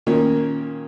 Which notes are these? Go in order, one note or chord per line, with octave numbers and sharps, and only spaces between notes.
A#2 D#3 A#3 C#4